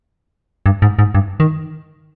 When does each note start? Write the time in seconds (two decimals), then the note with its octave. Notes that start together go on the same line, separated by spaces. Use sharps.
0.66 G2
0.82 G#2
0.99 G#2
1.15 G2
1.40 D#3